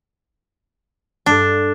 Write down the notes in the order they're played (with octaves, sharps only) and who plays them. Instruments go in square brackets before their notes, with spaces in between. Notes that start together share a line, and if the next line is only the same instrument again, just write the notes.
[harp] G2 A4 [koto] D4